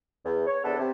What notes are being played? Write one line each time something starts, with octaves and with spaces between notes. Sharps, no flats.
E2
C#5
E2 C3 B3 D4 A4
C3